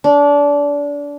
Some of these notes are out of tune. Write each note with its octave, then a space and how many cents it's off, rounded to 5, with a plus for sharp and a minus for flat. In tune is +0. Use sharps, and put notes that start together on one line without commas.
D4 -25